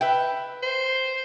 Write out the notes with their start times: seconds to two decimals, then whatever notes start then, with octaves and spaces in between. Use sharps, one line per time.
0.01 B4 E5 G5
0.63 C5